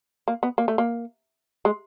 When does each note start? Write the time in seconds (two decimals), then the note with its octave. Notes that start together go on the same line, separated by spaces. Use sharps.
0.28 A#3
0.43 B3
0.58 A#3
0.68 A3
0.78 A#3
1.65 G#3